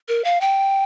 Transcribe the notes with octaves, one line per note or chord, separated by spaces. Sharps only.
A#4
F5
G5